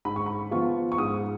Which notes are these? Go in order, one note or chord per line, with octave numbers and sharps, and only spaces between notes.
G#2 B5
C#6
B5
F3 B3 F4 C#6
C#6
G#2 D#6